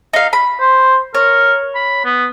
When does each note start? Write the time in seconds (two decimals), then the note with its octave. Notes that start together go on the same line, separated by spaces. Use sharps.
0.13 D#4 F5
0.33 B5
0.60 C5
1.15 A#4 C#5
1.75 B5
2.05 B3